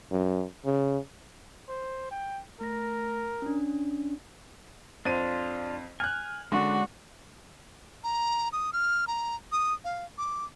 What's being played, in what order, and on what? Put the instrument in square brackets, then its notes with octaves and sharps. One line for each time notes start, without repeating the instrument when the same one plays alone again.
[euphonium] F#2
C#3
[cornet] C5
G5
[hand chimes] A3 A#6 [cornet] A#4
[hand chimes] C#4 D4
[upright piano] F2 C4 D#7 [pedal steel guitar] D4 F4
[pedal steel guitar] G#5 [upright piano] F6 F#6
[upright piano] D3 [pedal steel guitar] G#3 C#4 D4 [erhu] F#4
[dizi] A#5
D#6
F6
A#5
D#6
F5
D6